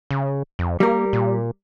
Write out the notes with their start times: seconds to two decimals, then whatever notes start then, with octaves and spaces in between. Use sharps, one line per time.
0.11 C#3
0.59 F2
0.80 G3 A#3 A#4
1.13 A#2